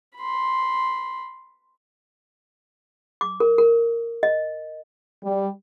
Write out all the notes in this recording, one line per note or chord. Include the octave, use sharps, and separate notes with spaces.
B5 C6
D6
A#4
A#4
D#5
G3